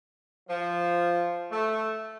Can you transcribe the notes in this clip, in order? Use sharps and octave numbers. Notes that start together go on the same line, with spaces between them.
F3
A3